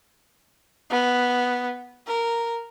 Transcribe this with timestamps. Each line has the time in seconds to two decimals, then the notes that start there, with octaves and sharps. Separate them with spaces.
0.90 B3
2.07 A#4